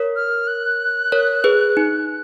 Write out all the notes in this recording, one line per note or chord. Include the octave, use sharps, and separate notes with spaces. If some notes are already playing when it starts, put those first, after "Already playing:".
Already playing: A#4 C#5
F6
F#6
A#4 C#5
G#4 B4
D#4